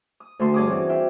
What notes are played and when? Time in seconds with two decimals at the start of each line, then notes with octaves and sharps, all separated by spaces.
0.20 D#6
0.39 D2 A3 F#4 A4 C6
0.54 G2 C#4 G#4 D6 D#6
0.68 E3 C4 F#4 D5
0.89 F4 E5 G5